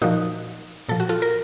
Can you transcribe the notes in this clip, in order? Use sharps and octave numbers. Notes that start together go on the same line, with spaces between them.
A#2 F3 D#4 F#4
A#2 F3 A4
F#4
F4 A4
A#4